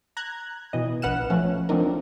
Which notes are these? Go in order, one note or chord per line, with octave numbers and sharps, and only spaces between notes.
A#5 F#6 G#6
B2 E3 D#5
A#1 B4 F#5 F6 F#6 E7
F3 F#3 A3 C#4
F3 A3 C4 D4 D#4 A#4